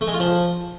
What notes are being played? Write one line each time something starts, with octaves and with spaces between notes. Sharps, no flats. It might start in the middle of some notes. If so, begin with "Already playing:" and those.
A3
G#3
F4
F3